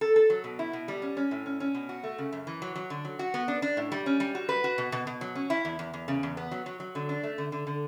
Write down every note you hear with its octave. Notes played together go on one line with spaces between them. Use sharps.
A4
A4
F#3
B2
E4
B2
G3
C#4
C#4
A2
C#4
C#4
B2
F#4
A3
C#3
F#2
E3
F#3
F#3
D3
F#3
F#4
B3
D4
D4
A2
G3
C#4
G3
F#4
B4
F#4
B2
B2
B2
F#3
C#4
E4
E2
E2
E2
C#3
E2
B3
F#3
F#3
F#3
D3
D4
A3
D3
D3
D3